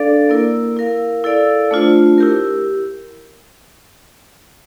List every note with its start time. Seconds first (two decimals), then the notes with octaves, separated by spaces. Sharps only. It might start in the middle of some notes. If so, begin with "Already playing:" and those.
Already playing: D4 A4 D5 F5
0.29 A#3 E4 A#4
0.77 E4 A#4 F5
1.24 E4 A4 D5 F5
1.71 A3 D4 F4 C5
2.18 E4 G4 A#4